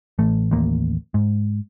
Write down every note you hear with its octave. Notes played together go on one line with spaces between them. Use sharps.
A1 A3
A1 D#2 A#3
G#2